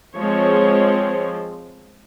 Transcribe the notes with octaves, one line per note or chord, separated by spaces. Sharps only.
F3 G#3 C4 C#5